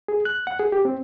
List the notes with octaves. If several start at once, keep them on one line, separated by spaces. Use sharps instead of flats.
G#4
F#6
F#5
G#4
G4
C4